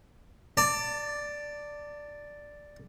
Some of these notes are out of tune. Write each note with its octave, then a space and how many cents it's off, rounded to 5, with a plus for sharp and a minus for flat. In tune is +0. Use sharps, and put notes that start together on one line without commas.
D5 +0 A5 +35